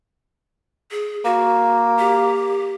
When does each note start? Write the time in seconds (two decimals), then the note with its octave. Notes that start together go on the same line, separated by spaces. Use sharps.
0.91 G#4
1.24 A#3 F#4
1.99 G4